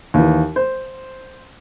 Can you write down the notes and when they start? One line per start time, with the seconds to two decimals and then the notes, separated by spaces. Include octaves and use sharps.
0.14 D#2 E3
0.56 C5